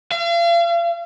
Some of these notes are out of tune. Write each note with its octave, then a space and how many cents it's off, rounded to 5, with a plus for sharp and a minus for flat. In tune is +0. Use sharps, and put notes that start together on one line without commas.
F5 -40